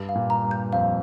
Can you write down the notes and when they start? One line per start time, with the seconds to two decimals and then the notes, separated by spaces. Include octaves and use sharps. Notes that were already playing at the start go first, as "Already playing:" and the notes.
Already playing: G2
0.09 F5
0.15 A#2
0.30 A#5
0.44 G2
0.51 G6
0.73 F2 F5